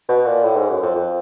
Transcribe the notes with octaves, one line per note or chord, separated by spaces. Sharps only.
B2
A#2
A2
G#2
F#2
F2
F2